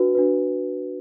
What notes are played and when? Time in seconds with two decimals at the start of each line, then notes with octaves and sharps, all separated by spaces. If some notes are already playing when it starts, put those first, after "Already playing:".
Already playing: D4 F#4 B4
0.15 D4 F#4 B4